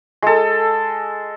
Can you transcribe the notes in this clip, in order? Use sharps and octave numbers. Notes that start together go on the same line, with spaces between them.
G#3 A4